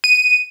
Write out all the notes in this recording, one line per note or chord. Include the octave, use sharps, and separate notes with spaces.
D#7